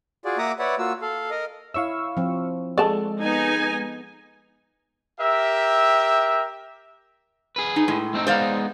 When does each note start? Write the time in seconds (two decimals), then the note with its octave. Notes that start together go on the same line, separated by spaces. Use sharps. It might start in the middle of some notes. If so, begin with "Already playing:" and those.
0.25 F4 F#4 G#4 D5
0.38 A#3 E5 F#5 A#5 D6 D#6
0.59 B4 C#5 D5 E5 F#5
0.78 A#3 F4 F#4 E6
1.02 A4 F5
1.31 A#4 D#5
1.74 E4 C#5 E5 F5 C#6 E6
2.17 F3 C4
2.78 G#3 A4 D5 A5
3.20 B3 D#4 G#5
5.20 G4 A#4 E5
7.56 G#4 B4
7.76 D#4
7.88 A2 G#3
8.14 A3 C4 D#4
8.27 G#3 B3 D#4 C5 D5 F5